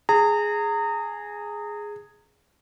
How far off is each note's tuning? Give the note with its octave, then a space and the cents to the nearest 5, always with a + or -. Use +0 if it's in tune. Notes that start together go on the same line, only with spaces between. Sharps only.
G#4 +0 A#5 -30